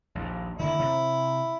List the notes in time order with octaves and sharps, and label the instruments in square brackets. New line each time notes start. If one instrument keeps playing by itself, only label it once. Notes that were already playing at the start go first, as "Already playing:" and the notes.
[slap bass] A#1 D#2
[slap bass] D3 D#3 A#3 [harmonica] E4
[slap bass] C3